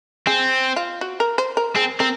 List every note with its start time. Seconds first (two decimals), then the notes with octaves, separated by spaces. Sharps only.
0.27 C4 G#4
0.76 F4
1.01 F#4
1.20 A#4
1.38 C5
1.57 A#4
1.75 C4 G#4
2.00 C4 A#4